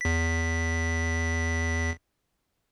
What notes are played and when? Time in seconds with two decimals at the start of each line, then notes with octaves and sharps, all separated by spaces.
0.01 E2 B6